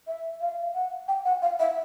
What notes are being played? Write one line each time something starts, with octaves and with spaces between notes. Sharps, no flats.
E5
F5
F#5
G5
F#5
F5
E5